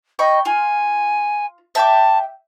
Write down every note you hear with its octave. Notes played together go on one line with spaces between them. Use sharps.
D#5 G5 B5 C#6
F4 G#5
E5 G5 A5 D6